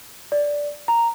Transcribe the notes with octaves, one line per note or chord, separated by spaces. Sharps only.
D5
A#5